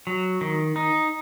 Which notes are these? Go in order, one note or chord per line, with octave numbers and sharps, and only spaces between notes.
F#3
D#3
D#4